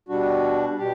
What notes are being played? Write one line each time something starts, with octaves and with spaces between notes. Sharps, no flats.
B2 G3 D4 F#4
B2 G4